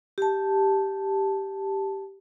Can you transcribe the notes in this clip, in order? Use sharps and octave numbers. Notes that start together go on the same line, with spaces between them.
G4 A5